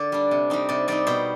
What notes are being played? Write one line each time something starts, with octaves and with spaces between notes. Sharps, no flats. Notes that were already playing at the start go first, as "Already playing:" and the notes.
Already playing: D3 D5
G3 D4
C3
G3 C4 D#4
C3 D5
G3 C4 D#4 D5
B2 C5